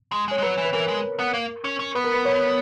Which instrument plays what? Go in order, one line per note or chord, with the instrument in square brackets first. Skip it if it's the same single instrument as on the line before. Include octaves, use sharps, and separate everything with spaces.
[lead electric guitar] G#3
G#3
[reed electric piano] C#5
[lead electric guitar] G#3
[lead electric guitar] F#3 [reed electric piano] B4
[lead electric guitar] E3
[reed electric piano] B4
[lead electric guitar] E3 [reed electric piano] A#4
[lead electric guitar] G#3
B3
A#3
C#4
C#4
[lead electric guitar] B3 [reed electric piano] B4
[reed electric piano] A#4
B4
C#5